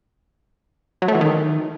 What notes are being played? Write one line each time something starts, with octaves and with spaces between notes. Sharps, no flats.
F#3
A3
E3
D#3